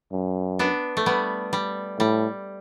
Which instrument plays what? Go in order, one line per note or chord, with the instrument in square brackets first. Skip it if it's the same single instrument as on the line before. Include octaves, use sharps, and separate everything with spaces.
[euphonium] F#2
[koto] B3 D4
A3
G3 B3
G3
[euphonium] A2 [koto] G3